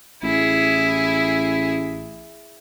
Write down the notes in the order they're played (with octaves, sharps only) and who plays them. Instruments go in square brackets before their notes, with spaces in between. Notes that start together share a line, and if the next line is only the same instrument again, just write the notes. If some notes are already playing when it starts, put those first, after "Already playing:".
[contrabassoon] A1 [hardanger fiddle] E4 G#4